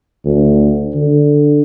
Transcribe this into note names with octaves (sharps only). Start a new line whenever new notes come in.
D2
D3